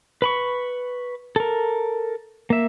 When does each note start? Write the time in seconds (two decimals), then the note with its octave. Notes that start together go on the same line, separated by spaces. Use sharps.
0.22 B4 B5 C#6
1.36 A4 A#4
2.50 A#3 E5